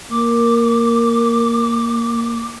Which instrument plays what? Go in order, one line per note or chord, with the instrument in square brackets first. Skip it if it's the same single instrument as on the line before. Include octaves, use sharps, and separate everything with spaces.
[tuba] A#3 [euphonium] A#4 [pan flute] D6